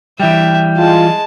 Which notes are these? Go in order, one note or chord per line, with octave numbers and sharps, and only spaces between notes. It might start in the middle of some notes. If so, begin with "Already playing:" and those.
E3 G3 E5 G5
G#3 F4 A5